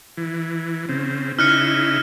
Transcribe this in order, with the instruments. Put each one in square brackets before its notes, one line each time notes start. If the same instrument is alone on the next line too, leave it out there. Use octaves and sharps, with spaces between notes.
[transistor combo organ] E3
C#3 C4
[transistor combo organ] C#3 D#4 E4 [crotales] F6 F#6 C#7